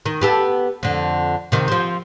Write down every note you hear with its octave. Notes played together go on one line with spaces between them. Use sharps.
D#3
B3 G4 A4
F2 D3
C3 D#3
F3 C4